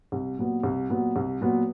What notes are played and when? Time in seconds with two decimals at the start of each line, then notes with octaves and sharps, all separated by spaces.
0.12 C2
0.38 A#2 F#3 B3
0.63 C2
0.90 A#2 F#3 B3
1.16 C2
1.41 A#2 F#3 B3